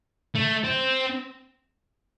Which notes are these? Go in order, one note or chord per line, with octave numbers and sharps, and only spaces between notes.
A3
C4